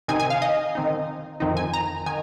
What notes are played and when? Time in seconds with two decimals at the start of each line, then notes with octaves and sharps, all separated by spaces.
0.08 C3 D#3 C4 D#4 G#5
0.20 G#5
0.30 F5
0.42 D#5
0.75 D#3 C4 D#4
1.40 F2 D#3 C4 D#4
1.57 G#5
1.74 A#5
2.06 D#3 G#5